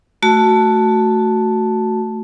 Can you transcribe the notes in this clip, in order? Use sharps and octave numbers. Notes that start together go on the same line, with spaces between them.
A3 F#4 A5